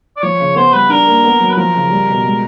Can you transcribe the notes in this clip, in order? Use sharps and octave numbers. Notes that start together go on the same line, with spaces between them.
D5
F3 C#5
C#3
B3 C5
G3 B4
D4 A#4
A#3
B3
F#3
B4
F3 A#4
C#3
G3
B2
G#3